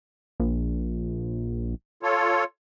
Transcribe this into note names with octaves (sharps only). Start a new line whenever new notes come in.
A#1
F4 A4 C#5